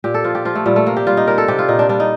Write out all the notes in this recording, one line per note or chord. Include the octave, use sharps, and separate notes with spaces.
A#2 G4
A4
F3 F4
G4
F3 F4
A3
A#2 G3
A3
C3 A#3
G4
G3 F4
D#4
G3 A#4
A4
C3 G4
F4
A#2 D#4
D4
G3 D4
D#4